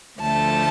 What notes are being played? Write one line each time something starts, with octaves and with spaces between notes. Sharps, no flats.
D2 D3 F3 A3 A5